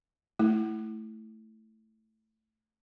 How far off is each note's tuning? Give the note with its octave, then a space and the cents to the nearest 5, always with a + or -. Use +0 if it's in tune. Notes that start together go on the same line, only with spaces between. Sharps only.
A3 +0 E4 +0